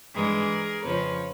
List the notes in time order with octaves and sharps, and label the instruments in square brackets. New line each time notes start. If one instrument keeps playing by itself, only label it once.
[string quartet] G2 E3 G#3 G#4 A#4
F2 C#3 F3 B4 C#5